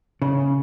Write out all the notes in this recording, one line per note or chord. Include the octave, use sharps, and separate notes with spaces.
C#3